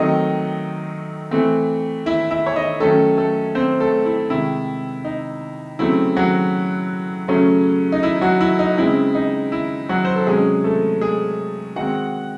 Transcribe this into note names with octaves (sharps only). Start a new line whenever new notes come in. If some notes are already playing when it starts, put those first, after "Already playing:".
Already playing: D#3 F#3 A3 C4 D#4 D#5
E3 A3 C4
E4 E5
E4 E5
C#5
D#4 D#5
D#3 F#3 A3 C#4 A4
A3 A4
C4 C5
A3 A4
E4
C3 D#3 G#3 E4
D#4
C#3 F#3 A3 C4 E4
F#3 F#4
C#3 F#3 A3 C#4
D#4
E4
F#3 F#4
E4
D#4
C#3 G#3 C4 E4
D#4
E4
F#3 F#4
C5
A4
C3 F#3 G#3 C#4 G#4
A3 A4
G#3 G#4
D#3 G#3 C4 F#4 F#5